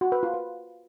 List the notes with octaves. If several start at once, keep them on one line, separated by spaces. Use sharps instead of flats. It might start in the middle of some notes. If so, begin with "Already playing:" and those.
F#4
B4
F4
B4